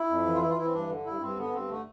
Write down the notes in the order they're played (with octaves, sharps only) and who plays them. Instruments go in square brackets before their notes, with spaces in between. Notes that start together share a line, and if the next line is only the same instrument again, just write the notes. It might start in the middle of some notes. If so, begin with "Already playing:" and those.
Already playing: [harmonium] E4
F2
E3
F4
E3 E4
F4
E3 E4
C4
G2 D4
D3
G2 E4
G2 C4
D3 B3
G2 C4
D3 A3